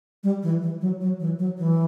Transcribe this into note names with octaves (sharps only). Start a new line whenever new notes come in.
G3
E3
E3
F#3
F#3
E3
F#3
E3